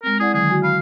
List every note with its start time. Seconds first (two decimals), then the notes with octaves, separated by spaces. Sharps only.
0.03 G#3 C4 A#4
0.20 E4 G#4 D5 F#5
0.34 D3 D#3 F#3 G#4
0.50 F#4 G#5
0.63 F5 B5